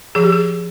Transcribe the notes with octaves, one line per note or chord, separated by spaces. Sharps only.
F3 G#4
G4
G#4